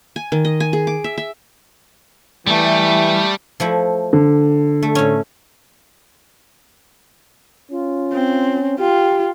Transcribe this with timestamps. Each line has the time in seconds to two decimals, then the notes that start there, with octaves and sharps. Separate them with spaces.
0.16 G#5
0.32 D#3
0.45 D#5
0.60 G#5
0.73 G#4
0.87 D6
1.04 E5
1.18 E5
2.47 E3 G3 A3
3.60 F3 A3 E4
4.13 D3
4.83 A3
4.95 A2 C#4
7.71 C#4 F4
8.12 C4
8.79 F4 G4 G5